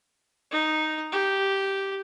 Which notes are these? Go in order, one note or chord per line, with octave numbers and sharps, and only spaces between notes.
D#4
G4